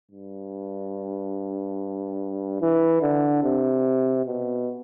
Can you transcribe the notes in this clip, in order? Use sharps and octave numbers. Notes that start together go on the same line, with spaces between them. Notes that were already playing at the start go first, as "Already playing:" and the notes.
G2
E3
D3
C3
B2